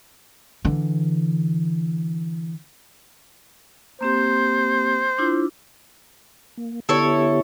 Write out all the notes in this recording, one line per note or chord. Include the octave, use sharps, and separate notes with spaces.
D3 E3
A#3 C4 G4 C5
D4 E4 F4
A#3
D3 B3 E4 G4 A4 C#5